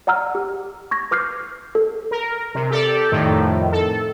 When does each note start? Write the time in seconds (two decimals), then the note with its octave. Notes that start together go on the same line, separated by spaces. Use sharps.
0.07 D5 F#5 A#5 E6 F6
0.35 G4
0.91 C#6 G#6 A#6
1.11 B4 D6 F6 G6 C7
1.75 A4
2.11 A#4
2.55 C3
2.71 G4 A4 D5
3.11 F2 A2 D#3
3.72 A4